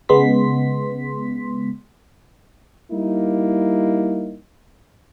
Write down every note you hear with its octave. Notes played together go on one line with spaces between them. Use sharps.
C#3 G#3 B3 C6 B6
G3 A#3 D#4 E4